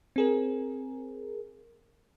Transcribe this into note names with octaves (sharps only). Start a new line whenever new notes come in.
C4 G#4 A#4